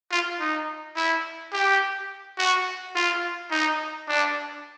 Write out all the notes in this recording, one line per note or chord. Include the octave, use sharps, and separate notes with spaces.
F4
D#4
E4
G4
F#4
F4
D#4
D4